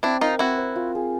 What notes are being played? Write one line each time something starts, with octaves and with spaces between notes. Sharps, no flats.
C4 D4 E4
D#4 F4 A#4
C4 E4 F#4
C5
F4
G#4